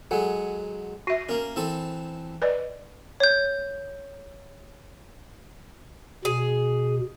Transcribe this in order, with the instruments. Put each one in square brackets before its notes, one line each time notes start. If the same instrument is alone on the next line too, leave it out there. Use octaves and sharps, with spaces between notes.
[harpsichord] F#3 G#3 [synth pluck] A4 F#5 G#5
[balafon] F#4 E5 [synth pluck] A#6 C7 D#7
[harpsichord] A#3 C#4 [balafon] A#4
[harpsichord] E3 C4 A4
[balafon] B4 D5 D#5
[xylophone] C#5 G6
[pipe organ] B2 [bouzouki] G#4